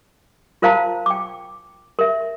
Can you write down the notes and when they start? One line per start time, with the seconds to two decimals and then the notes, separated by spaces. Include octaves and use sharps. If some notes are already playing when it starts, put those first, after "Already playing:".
0.62 F4 A#4 C5 F5 A5 A#5
1.06 G5 D6
1.99 A#4 E5